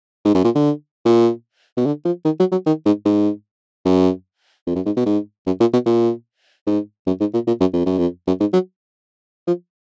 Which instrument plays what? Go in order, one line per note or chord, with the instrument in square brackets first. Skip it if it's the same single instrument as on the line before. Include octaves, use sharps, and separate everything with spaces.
[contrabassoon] G#2
F#2
A#2
D3
A#2
B2
D3
F3
D#3
F#3
F#3
D#3
G#2
G#2
F#2
F2
F#2
G#2
B2
G#2
F#2
A#2
B2
A#2
G#2
F#2
G#2
A#2
A#2
F#2
F2
F#2
F2
F#2
G#2
F#3
F3